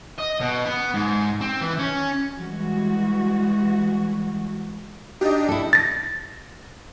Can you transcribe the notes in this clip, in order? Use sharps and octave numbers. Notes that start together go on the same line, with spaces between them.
D#5
B2
B3
G#2
C4
E3
C#4
E3 G3 G#3 F#4
D4 D#4 G4 D#5
E4 A4
A6 A#6